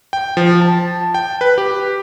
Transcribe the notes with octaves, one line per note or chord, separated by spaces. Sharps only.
G5
F3
A5
G5
B4
G4